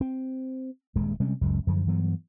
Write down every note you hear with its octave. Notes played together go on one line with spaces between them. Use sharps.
C4
D#1 G2 G#3
C3 G3 G#3 C#4
F#1 C#2 F#2 G#3
F#2 D3 F3
G2 E3 F#3 B3